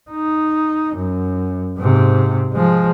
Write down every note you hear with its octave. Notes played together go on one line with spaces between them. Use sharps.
D#4
F#2
G#2 C3
F3 G#3